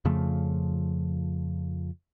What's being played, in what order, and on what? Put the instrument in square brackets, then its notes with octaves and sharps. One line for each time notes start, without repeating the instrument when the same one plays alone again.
[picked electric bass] F2 C#3 F3 A3